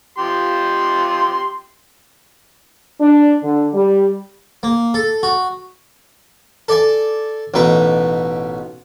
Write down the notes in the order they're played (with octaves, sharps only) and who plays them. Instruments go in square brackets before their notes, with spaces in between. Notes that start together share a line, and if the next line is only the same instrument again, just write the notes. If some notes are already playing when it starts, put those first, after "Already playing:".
[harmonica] F3 G4 C6
[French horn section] D4
D3
G3
[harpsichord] A#3
A4
F#4
A4 D5 G#5 A5
A1 B2 D#4 B4